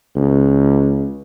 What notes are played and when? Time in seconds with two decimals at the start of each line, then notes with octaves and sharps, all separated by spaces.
0.16 C#2